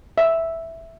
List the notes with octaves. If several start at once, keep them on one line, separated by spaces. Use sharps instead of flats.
E5